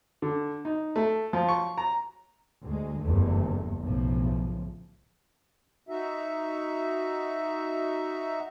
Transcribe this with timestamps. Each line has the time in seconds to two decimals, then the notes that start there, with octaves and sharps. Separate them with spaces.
0.22 D3
0.65 D#4
0.96 A3
1.33 F3
1.49 C#6
1.78 A#5
2.63 D2 G#3
3.02 F#1 E2 G2 D3 A3
3.81 B1 A2 C#3 F3
5.89 D#4 F#4 E5